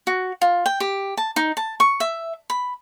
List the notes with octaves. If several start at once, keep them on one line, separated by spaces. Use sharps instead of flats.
F#4
F4
G5
G4
A5
D#4
A5
C#6
E5
B5